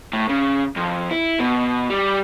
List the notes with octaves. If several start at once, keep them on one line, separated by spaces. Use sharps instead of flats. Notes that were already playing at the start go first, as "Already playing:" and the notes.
A2
C#3
F2
E4
B2
G3